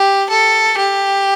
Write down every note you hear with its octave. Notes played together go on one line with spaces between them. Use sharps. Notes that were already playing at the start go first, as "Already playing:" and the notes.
Already playing: G4
A4
G4